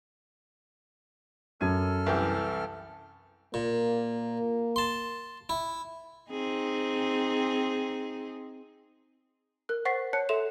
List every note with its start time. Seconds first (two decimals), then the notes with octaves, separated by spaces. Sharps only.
1.61 F#2 A4 F6 G#6 D#7
2.06 C2 E3 G4
3.54 A#2 A#3
4.76 A5 C6
5.49 E4
6.30 C4 D#4 G#4
9.69 A#4 F#6
9.85 C5 F#5 C#6 A6 B6 C7
10.13 C#5 A5 F#6 C#7
10.29 A4 E5 C6 E7 F7